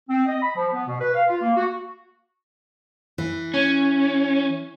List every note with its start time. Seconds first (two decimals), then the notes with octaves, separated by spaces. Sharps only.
0.09 C4
0.26 D#5
0.41 B5
0.56 F3
0.72 B3
0.86 B2
1.00 B4
1.13 F5
1.28 F4
1.42 A#3
1.55 F#4
3.18 E3
3.54 C#4